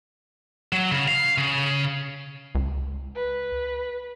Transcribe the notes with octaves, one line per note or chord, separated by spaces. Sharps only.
F#3
C#3
F5
C#3
C#2
B4